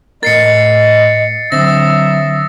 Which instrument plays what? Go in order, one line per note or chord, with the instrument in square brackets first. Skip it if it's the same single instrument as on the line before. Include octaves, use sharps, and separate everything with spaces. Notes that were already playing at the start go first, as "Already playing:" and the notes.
[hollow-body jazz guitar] A2 A#4 [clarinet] D#5 [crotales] A6 C7 C#7
[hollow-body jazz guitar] D3 C4 [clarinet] F#3 [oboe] E5 [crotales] D#6 A#6